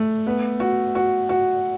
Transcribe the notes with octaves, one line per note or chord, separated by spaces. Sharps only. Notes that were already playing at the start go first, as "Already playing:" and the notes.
Already playing: A3
B3
F#4
F#4
F#4